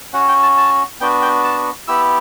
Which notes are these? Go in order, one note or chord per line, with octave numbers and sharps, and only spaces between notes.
C#4 F#4 F#5
G5
A5
A5
B3 D4 F#4 G5
G5
A5
B3 E4 G4 E6